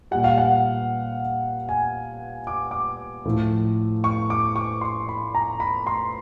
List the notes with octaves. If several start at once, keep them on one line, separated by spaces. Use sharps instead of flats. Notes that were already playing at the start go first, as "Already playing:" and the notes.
A#2 G3 F#5
F5
F#5
G#5
D6
D6
A2 F3 A3
C#6
D6
C#6
C6
B5
A#5
B5
C6